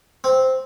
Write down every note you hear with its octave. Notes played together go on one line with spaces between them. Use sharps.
C4